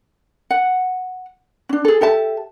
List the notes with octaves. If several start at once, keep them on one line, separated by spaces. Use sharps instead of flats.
F#5
C#4 D4
G#4 A4
G4 A4 E5 A5